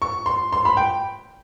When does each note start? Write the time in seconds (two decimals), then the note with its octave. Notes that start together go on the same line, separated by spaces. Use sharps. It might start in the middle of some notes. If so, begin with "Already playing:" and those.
0.02 C#6
0.26 C6
0.52 C6
0.65 B5
0.77 G5